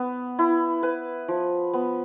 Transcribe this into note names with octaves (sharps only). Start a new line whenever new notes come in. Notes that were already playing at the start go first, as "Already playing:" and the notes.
Already playing: B3
E4
B4
F3
B3